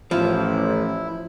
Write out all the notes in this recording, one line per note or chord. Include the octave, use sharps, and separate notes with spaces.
A1 F3 E4